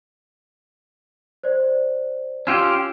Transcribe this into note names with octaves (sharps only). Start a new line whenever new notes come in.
C5 D5
C#4 F4 G4 E6 G6 E7